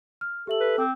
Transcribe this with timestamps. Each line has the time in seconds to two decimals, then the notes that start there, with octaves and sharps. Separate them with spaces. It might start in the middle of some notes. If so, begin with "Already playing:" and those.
0.21 F6
0.47 G4 A4 E5 F#7
0.60 B4
0.78 C4 D6